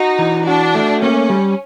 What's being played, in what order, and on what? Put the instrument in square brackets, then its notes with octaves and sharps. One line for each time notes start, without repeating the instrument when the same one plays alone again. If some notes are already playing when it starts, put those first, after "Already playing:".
Already playing: [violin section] D#4 [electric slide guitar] F#4
[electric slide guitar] E3
[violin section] D4 [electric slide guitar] F#4
[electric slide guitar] A3
[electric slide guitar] A#3 [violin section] C#4
[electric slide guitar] G3